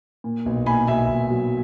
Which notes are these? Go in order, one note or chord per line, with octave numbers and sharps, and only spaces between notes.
A#2
B1
A#2 G#5 B5
B1 E5 G#5
B1
F#3